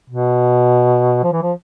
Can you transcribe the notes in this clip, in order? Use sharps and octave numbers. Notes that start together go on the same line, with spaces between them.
B2
F3
E3
F3